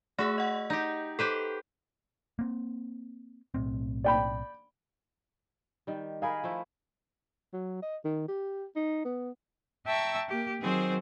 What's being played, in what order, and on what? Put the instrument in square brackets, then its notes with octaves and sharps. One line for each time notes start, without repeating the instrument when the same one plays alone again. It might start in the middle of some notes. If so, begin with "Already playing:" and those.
[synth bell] A3 G#4 [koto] F#4 E5
[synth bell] D#5 F#5
[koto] D#4 G4
[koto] G4 B4 C5 [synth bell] A4
[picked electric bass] A#3 C4
B1 A2 C4
[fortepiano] D5 G5 B5
[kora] D#3 G3
[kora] D#4 G#4 A#4 [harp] F5 G#5 B5
[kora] F3 A3 E4
[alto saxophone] F#3
D#5
D#3
G4
D#4
B3
[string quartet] E5 G5 A5 A#5 C#6 E6
A#3 G4
D#3 F#3 C4 G#4 C5